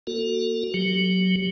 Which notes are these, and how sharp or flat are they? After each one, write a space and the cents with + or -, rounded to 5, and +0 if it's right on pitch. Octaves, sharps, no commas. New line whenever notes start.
A#3 +20 F#4 +0 A4 +30
F#3 +0 G4 +0